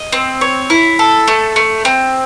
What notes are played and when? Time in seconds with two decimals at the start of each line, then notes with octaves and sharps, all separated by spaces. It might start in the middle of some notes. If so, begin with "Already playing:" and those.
Already playing: D#5
0.13 C4
0.41 C#5
0.70 E4
0.99 A4
1.28 A3
1.56 A3
1.85 C4